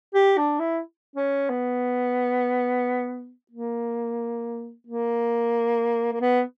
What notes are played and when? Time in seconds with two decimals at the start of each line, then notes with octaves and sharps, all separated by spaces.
0.14 G4
0.37 D4
0.59 E4
1.16 C#4
1.50 B3
3.51 A#3
4.87 A#3
6.13 A#3
6.21 B3